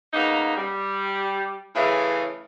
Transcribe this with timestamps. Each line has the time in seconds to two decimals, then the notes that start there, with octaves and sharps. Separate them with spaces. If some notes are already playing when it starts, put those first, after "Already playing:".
0.13 C#3 A#3 B3 D#4
0.56 G3
1.75 A2 C#3 E3 G#4